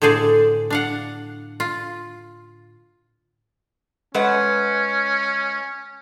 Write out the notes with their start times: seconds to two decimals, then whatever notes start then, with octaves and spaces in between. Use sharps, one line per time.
0.02 A2 D3 G#4 C5 D5
0.70 D4 F5 F#5
1.60 F4
4.14 G#3 C#4 B4 F#5